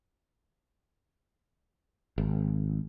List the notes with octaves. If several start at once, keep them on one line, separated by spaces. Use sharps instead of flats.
G#1